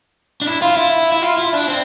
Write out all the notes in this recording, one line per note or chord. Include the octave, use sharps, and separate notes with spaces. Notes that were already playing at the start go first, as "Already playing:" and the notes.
D4
E4
F4
E4
E4
F4
E4
D4
C4